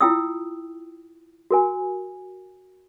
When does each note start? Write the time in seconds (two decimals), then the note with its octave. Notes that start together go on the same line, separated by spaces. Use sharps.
0.01 E4 F4 G5 D#6 E6
1.51 F#4 A#4 G#5